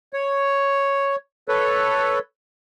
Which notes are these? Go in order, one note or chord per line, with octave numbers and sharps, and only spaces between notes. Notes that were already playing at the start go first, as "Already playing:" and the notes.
C#5
A4 B4 C#5